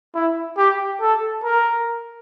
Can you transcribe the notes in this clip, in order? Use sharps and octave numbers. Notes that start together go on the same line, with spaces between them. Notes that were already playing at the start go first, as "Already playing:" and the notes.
E4
G4
A4
A#4